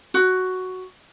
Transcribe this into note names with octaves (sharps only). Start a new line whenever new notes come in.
F#4